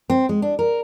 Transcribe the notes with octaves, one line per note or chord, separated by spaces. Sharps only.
C4
G#3
D4
A#4